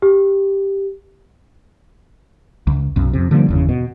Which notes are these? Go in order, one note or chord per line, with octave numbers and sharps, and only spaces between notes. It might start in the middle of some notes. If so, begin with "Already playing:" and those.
G4
C#2
B1 F#2
F2 C3
D3 F3 G3 A#3
G1 E2 C#3
B2